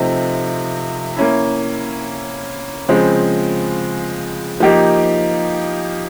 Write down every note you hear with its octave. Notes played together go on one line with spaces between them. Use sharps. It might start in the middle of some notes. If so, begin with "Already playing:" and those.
Already playing: C3 F3 A3 C4 D#4
A#3 C#4 E4
C#3 F3 G#3 C4
F3 A#3 D#4 G4